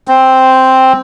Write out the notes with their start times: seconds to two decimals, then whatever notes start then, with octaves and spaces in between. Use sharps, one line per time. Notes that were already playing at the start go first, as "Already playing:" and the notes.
0.08 C4